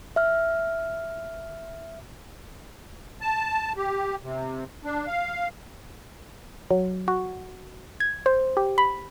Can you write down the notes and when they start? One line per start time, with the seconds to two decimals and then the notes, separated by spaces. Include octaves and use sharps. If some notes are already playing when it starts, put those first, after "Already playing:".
0.16 E5 F6
3.21 A5
3.76 G4
4.23 C3
4.85 D4
5.07 F5
6.71 F#3
7.08 F#4
8.00 G#6
8.26 C5
8.57 G4
8.78 B5